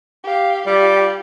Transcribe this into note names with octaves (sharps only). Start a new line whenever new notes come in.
G4 F5
G3 F4 G4